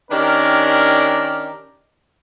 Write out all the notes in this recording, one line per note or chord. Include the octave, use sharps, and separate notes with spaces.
D#3 C#4 D4 G4 A#4